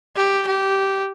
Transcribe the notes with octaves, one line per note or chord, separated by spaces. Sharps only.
G4
G4